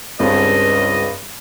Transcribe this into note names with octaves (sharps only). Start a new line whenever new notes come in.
C#2 G2 C4 A4 D#5